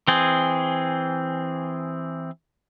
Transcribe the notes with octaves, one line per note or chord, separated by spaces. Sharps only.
E3 C4 G#4